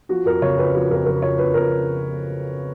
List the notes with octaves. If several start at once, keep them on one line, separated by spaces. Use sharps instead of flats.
F3 F#4
F2 A#4
C#3 C#5
F2 B4
F3 F#4
F2 A#4
C#3 A#4
F2 C#5
F3 B4
F2 A#4